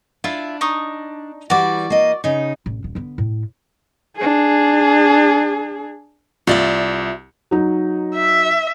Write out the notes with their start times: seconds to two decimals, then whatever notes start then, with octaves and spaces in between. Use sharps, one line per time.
0.24 D4 E4 F4 E5
0.61 D#4 C#6 D#6
1.50 E3 G3 F#4 D5
1.90 A#3 D#5
2.24 C#3 D#4
2.66 A1
2.84 D#1
2.95 D3 B3
3.18 A2
4.17 D4 G#4
6.47 C2 F4 D5 E5
7.51 F#3 D#4
8.15 E5